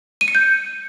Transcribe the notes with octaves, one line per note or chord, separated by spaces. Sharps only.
D#7
C#7
G6